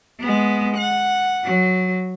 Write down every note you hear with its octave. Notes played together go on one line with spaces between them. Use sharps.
G#3 B3
F#5
F#3